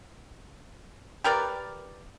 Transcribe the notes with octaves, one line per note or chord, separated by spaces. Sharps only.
G4 A#4 B4 D5